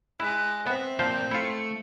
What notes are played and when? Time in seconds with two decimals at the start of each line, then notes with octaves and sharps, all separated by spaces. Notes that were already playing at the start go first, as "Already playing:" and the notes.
0.20 G#3 E4 F#6
0.67 B3 C4 E5
0.99 A#2 F3 A#3 C5 G6
1.31 A3 E4 F4 C#7